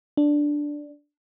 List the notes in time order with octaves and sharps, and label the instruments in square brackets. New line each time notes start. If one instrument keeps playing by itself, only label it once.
[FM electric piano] D4